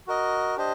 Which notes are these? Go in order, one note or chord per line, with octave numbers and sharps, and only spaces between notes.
F#4 A#4 D#5
D4 G4 C5 D#5